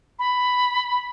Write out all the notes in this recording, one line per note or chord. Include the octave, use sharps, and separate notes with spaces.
B5